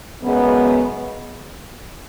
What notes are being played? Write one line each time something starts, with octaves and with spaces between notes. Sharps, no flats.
F#2 C#3 G#3 B3